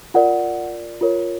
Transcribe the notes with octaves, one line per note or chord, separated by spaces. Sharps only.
F4 A#4 D5 F#5
F4 A#4 C#5